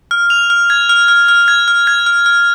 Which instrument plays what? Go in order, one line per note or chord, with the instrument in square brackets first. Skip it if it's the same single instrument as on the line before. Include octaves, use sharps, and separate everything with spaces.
[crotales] F6
F7
F6
G#6
F6
F6
F6
G#6
F6
G#6
F6
F6